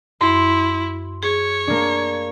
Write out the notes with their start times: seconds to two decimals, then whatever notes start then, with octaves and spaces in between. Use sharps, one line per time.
0.21 F#2 E4 C6
1.23 G#4 C#5
1.67 A#3 D4